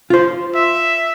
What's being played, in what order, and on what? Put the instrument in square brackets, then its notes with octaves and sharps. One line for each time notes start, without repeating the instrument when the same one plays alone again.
[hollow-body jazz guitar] F4 C5
[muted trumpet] E5